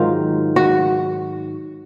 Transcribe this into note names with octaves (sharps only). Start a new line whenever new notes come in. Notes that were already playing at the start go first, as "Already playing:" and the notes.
Already playing: G#2 D#3 F#3 F4
F#4